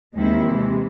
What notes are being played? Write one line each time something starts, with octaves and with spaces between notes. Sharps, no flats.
D#2 D#3 G#3 C4 E4
C3 E3 G#3